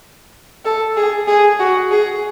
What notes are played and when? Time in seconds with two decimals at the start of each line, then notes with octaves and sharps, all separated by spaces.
0.65 A4
0.96 G#4
1.27 G#4
1.59 F#4
1.91 G#4